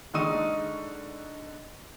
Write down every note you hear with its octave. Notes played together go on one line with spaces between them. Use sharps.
D3 G#3 D#4 C#6 D#6 D#7